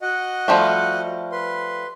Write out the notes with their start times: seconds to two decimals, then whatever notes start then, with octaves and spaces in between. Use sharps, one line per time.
0.02 F#4 D#5 F#5
0.48 F3 G3 A3
1.32 B4 C6